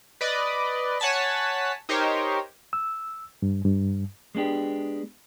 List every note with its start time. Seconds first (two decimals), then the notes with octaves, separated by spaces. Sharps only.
0.21 B4 D5 D#5
1.00 C#5 F#5 G#5 A5 B6
1.89 D#4 G4 A#4 C5 C#5
2.73 E6
3.42 G2
3.64 G2
4.35 G#3 B3 D4 G4